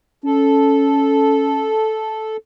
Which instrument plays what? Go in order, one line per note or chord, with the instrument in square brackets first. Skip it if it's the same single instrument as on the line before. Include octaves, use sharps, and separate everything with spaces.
[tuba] C#4 [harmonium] A4